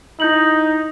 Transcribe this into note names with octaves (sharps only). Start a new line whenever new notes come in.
D#4 E4 G6 F#7